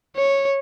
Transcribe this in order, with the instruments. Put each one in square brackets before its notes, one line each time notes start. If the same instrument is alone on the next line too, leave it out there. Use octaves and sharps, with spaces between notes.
[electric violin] C#5